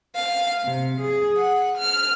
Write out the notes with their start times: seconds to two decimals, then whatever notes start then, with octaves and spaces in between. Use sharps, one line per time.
0.15 F5
0.64 C3
1.02 G#4
1.38 F#5
1.78 F6